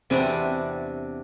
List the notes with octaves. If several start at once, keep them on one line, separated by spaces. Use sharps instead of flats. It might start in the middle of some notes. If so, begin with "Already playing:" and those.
E2 C3 G3 C4 D4 F#4